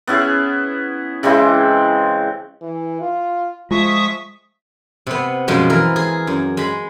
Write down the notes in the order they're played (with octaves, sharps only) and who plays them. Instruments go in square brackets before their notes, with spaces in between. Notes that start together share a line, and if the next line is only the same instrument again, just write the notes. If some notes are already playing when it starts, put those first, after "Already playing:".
[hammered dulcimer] B3 C#4 E4 G#4
C#3 E3 G#3 C4
[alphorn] E3
F4
[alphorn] F3 [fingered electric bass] G#3 [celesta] F4 [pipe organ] E5 C#6 D#6
[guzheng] C3 B3
F#2 B2 F3 G#3
E3 A#4
G#4
F#2
G#3 B5